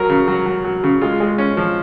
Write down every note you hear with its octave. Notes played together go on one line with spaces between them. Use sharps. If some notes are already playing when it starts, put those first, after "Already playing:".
Already playing: F#3 A#4
C#3
F#3
F#3
F#3
C#3
G#3 F4
G#3
C#4
F3